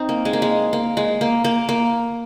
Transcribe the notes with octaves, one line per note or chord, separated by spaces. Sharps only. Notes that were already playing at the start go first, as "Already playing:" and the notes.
Already playing: C4 D#4
A#3
G#3
A#3
G#3
A#3
G#3
A#3
A#3
A#3